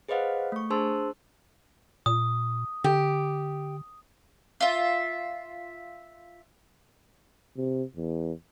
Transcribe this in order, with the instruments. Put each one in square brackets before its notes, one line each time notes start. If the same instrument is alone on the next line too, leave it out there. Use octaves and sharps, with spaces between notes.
[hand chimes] G#4 B4 C5 D#5 F5 F#5
A3 C#6
D4 G#4 C5 A5 C6 E6
[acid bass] A#2 [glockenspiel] D#6
[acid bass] D3 [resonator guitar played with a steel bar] G4
[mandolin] F4 E5
[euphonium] C3
E2